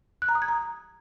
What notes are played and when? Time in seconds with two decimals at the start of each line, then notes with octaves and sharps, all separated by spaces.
0.22 F#6
0.29 A#5
0.35 D#6
0.42 G#6
0.48 A#5